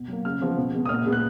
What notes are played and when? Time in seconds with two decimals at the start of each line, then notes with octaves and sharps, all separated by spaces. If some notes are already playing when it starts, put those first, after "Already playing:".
Already playing: B2
0.08 F#3 A#3
0.25 C#3 F6
0.41 F3 G#3 B3
0.58 B2
0.74 G#3 B3
0.85 D#6
0.89 A#2 F6
1.06 G#3 B3
1.12 F#6